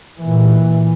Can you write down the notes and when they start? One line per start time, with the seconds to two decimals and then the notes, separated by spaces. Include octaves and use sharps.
0.19 A#2 E3